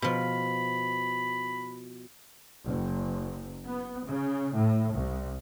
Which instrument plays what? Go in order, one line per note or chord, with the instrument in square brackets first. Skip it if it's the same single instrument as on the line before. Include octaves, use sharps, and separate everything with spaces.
[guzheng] B2 F3 [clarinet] B5
[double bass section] F#1
B3
C#3
A2
C2